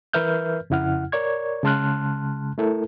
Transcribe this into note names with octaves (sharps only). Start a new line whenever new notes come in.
E3 A#4 B4 E5 F6 G6
F2 C#3 E4 F#5 F6
A#4 C#5 D5 C#6 G#6
C#3 G#3 A5 C6 F6 F#6
A3 E4 A4 A#4